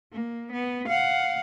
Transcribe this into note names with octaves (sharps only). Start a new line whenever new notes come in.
A#3
B3
F5 F#5